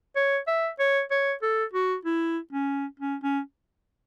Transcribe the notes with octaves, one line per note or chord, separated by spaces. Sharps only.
C#5
E5
C#5
C#5
A4
F#4
E4
C#4
C#4
C#4